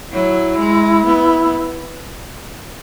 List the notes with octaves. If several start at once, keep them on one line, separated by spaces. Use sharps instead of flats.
F#3 E4
G#3
B3